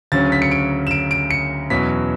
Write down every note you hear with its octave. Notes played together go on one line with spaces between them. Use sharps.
D2 C#3 F#3 C#4 A6
B6
C#7
D7
E7
D7
D7
C#7
E2 B2 F#3 C#4 B6